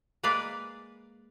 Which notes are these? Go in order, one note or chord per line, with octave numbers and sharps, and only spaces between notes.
G#3 A#3 B4 D5 F5